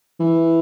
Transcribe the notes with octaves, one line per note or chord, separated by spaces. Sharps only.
E3